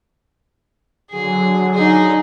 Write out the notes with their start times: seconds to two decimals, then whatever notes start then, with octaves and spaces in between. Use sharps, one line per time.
1.10 D3 F#3 G#4
1.74 D#4 G#4